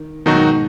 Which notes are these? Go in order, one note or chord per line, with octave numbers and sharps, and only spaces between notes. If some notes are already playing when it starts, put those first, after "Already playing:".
Already playing: D#3
B2 D#3 F#3 D#4 F#4
G#2